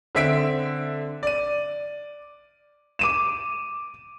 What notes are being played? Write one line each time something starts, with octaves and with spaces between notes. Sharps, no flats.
D3 C4 E5 B6 D7
D5 D#7
D6 D#7 E7